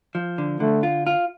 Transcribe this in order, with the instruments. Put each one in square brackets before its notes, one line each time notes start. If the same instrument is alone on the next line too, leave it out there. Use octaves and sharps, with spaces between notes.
[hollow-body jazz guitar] F3
D3
[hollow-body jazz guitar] D3 [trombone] A3
[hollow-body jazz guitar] F4
F4